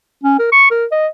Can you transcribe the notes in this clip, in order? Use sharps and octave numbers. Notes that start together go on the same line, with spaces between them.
C#4
A#4
C#6
A#4
D#5